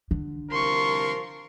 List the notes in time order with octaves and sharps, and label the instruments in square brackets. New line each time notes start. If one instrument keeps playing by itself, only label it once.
[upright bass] D3
[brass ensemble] C2 F3 A#4 [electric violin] C6 C#6